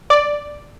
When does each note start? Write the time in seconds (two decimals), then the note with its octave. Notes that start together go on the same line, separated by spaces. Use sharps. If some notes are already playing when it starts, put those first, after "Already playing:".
0.10 D5